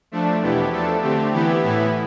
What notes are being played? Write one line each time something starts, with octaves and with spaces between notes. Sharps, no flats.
F3 A3 D4
E2 B2 B3 E4 G4
F3 A3 D4 A4
D3 A3 C4 G4
E3 B3 E4 G4
A2 E3 B3 E4